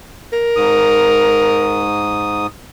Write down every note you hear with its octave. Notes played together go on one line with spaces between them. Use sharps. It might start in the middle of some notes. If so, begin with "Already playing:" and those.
A#4
G#2 D#6